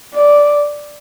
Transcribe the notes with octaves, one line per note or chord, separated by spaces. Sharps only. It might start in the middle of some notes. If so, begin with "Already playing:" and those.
D5